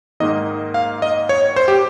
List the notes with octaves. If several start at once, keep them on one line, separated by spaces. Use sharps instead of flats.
G#2 D#3 A#3 D#4 D#5
F5
D#5
C#5
C5
G4